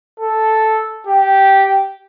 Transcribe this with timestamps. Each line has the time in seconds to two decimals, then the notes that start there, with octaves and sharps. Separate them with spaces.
0.20 A4
1.07 G4